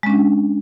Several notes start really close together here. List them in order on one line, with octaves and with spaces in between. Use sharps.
G#3 C#4 D4